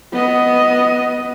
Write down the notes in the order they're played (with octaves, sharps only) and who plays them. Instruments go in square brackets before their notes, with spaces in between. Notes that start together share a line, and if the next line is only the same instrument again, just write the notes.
[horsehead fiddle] B3 D#5